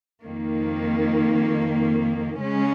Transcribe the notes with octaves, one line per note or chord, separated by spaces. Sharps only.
F2 D#3 A#3
C#3 G#3 C#4